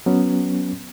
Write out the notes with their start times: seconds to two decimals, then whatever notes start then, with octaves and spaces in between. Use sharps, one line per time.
0.06 F#3 B3 C#4